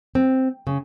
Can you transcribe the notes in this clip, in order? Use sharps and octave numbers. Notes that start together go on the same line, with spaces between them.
C4
C#3